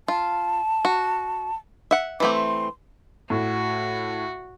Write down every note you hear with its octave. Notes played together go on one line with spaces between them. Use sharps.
F4 A5
F#4
E5 F#5
E3 A3 C4 D6
C6
A2 F#4